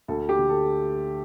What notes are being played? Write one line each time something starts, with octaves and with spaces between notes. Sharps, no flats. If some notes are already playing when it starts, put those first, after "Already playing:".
D2 A4
G4
D3
A4